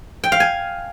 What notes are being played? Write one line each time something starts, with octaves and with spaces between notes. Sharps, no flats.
G5
F5
G#5